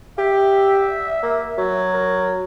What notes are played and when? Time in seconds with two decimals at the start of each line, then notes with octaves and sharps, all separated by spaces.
0.18 G4 E5
1.23 A#3
1.57 F#3
1.93 A#4